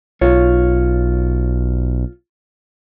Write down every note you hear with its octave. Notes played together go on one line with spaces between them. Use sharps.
B1 F4 C#5